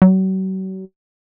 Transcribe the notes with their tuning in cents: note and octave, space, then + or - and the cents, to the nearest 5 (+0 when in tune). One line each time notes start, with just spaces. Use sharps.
F#3 +40